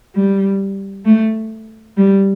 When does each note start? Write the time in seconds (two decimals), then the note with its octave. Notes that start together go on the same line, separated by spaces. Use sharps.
0.15 G3
1.05 A3
1.97 G3